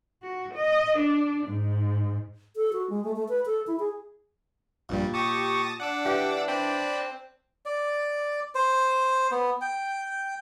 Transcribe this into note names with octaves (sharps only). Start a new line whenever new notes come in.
F#4
D#5
D4
G#2
A4
F#4
G#3
A3
A3
B4
A4
E4
G#4
A#1 G2 A#2 G3
G4 A5 C#6 D#6 A#6
D4 F#5 D6 E6
E3 G4
C4 D5 G5 B5
D5
C5
B3
G5